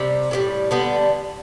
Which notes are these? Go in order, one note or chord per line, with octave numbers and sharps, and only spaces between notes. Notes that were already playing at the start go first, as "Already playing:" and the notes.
Already playing: C3 G3
A2 E3 G3
D3 G3 B3